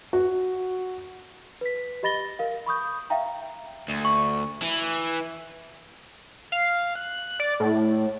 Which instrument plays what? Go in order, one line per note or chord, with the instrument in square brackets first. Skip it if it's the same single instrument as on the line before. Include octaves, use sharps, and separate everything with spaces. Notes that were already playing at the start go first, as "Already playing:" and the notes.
[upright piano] F#4
[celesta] B4 B6
G4 D#5 B5 A6 A#6 G7
A#4 F5
B5 C#6 D#6 G6
E5 F5 G5 A#5
[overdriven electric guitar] D2
[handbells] C#6
[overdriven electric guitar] E3
[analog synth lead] F5
F#6
D5
A2